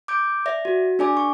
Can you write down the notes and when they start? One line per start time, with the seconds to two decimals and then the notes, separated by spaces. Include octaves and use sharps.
0.08 D6 G6 D7
0.46 D5 E5 A#6
0.65 F#4
0.99 D4 G#4 D5 G#5 D6
1.17 C#6